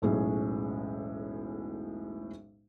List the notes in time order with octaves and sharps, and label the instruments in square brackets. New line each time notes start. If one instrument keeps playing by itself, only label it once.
[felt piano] E1 B1 A2 C#4 G#4